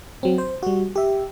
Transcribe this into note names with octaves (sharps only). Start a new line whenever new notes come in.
F#3 C4
C5
G3 F#4
G4 E5